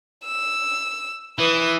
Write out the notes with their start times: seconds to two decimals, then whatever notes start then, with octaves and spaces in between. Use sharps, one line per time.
0.24 E6
1.38 E3 B4 D#6